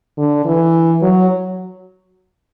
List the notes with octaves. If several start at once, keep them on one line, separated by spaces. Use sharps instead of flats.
D3
E3
F#3